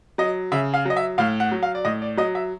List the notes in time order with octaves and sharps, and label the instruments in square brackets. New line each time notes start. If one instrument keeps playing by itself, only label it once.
[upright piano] F#3 D#5
C#3 E5
F5
F#3 D#5
E5
A2 F5
F#5
F#3
F5
D5
A2 D#5
D5
F#3 D#5
E5